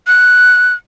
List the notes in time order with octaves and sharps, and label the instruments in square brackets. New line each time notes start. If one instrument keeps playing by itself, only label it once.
[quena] F#6